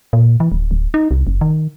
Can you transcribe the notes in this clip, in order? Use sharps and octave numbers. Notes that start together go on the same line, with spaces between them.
A#2
E3
D1
D1
D#4
C2
F#1
D#3